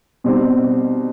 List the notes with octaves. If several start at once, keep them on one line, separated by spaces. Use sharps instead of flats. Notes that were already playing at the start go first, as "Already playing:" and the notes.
B2 G3 C4 D#4